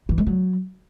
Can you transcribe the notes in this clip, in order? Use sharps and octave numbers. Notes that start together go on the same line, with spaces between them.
E3
G#3
F#3